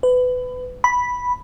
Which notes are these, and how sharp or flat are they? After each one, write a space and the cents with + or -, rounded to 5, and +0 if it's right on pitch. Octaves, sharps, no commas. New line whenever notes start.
B4 +25
B5 -5